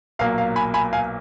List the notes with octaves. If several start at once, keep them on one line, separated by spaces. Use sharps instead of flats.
B1 A#2 F#3 A#3 F5
F5
G#5 B5
G#5 B5
F5 G#5